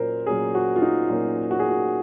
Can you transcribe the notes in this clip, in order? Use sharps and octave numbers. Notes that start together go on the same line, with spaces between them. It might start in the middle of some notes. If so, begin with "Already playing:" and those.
Already playing: A#2 F#3 A#3 C#4 A#4 C5
A#2 F#3 A#3 C#4 G#4
F#4
F4
D#4
A#2 F#3 A#3 C#4 F4
F#4
G#4
F#4